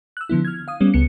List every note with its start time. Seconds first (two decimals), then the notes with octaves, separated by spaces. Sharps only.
0.17 E6 F#6
0.29 D3 F3 B3 E4
0.45 F6 G#6
0.68 F5 D#6
0.80 G3 B3 C#4
0.94 C#2 B3 C#7